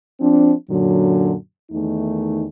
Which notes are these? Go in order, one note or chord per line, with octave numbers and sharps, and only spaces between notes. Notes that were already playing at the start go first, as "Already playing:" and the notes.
F3 C4 D4
F#2 A#2 D3 F#3
E2 D#3 A3 D#4